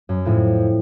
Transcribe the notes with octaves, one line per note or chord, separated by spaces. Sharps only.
F#2
F2 A2